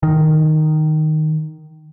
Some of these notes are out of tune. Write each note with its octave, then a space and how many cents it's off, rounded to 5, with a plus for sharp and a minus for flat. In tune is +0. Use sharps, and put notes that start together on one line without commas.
D#3 -5